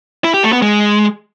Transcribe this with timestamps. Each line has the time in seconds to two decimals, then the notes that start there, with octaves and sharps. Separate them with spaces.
0.24 E4
0.34 G4
0.43 A3
0.53 B3
0.62 G#3